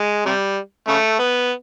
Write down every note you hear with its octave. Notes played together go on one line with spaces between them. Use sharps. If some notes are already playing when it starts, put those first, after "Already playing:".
Already playing: G#3
C3 G3
C#3 A3
B3